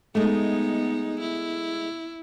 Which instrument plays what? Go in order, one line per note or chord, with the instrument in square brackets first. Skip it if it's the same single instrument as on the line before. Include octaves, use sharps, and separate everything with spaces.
[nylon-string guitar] G#3 A3 [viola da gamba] B3 D#4
[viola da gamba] E4